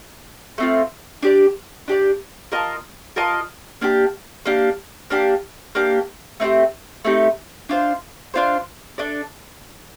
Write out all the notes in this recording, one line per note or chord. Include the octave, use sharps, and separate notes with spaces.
A3 C4 F4
D4 G4 D5
D4 G4 D5
F4 A#4 D#5 A5
F4 A#4 D#5 A5
A#3 D4 G4
A#3 D4 G4
A#3 D4 G4
A#3 D4 G4
A3 C4 D#4 G4
A3 C4 D#4 G4
D4 F4 C5
D4 F4 C5
D4 A4 D5